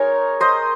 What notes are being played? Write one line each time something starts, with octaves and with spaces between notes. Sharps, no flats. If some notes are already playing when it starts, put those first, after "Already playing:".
Already playing: G#3 D#4 A#4 C#5
C5 D#5